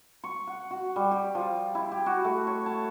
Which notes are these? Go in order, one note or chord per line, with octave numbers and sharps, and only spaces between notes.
C#6
F#5
F#4
G3
G4
F3
E4
G4
F#4
A3
C#5
A5